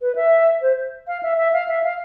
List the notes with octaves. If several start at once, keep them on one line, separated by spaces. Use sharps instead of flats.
B4
E5
C5
F5
E5
E5
F5
E5
F5